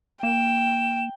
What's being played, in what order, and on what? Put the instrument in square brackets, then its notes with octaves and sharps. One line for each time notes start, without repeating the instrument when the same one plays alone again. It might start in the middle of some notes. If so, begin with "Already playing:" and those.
[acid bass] A#3 [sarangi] G5 [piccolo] E7